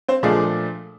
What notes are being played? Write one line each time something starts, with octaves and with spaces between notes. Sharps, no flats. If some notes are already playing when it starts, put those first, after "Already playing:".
C4 C5
A#2 F3 G#3 A3 D4 G#4